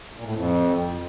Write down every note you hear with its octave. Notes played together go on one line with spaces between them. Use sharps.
A#2
A2
F2